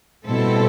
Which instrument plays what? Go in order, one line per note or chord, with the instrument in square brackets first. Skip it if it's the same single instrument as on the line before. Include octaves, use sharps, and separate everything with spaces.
[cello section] B2 G3 C4 E4 A4